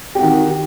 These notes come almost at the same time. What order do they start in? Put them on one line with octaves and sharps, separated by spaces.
G4 F#4 D#3